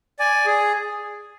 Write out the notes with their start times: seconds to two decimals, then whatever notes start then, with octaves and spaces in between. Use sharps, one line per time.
0.19 D5 G#5
0.46 G#4